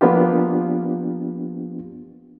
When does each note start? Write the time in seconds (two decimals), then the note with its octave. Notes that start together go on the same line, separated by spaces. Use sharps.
0.01 F3 A#3 B3 D4 F4 G4